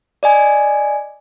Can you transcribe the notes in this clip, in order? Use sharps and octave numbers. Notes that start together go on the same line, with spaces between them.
D5 D#5 G#5